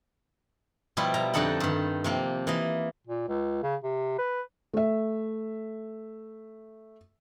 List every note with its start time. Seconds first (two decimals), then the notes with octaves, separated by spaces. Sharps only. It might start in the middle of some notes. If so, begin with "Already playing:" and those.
0.97 B2 F3 G3 E4 F4
1.14 B2 A#5
1.34 F2 D3 F3 D#4 A4 F#5
1.60 G2 D#3
2.04 C3 F3 A#3
2.47 E3 A#3 D#5
3.07 A#2
3.28 C#2
3.63 C#3
3.83 C3
4.18 B4
4.74 A3 E5